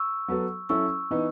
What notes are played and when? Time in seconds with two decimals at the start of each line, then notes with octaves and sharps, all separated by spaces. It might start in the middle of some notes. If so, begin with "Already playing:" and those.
Already playing: C#6 E6
0.28 F#3 B3 F#4 A4
0.69 F#3 C#4 E4 A4 C#6 E6
1.11 E3 B3 D#4